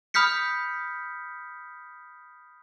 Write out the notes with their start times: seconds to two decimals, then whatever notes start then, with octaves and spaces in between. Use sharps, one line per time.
0.14 B5 D#6 F6 G6 B6 C#7